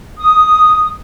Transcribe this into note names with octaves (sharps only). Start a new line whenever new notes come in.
D#6